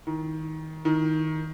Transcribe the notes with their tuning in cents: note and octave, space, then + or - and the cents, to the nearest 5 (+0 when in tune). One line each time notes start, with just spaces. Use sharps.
D#3 +20
D#3 +15